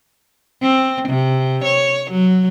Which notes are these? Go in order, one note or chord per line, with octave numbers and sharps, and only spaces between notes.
C4
C3
C#5
F#3